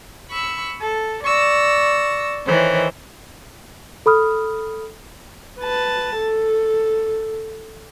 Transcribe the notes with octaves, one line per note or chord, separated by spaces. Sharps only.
B5 C#6 E6
A4
D5 C#6 E6 A#6
D#3 E3 C5 C#5
A4 B5 D#6 F6
B4 A5
A4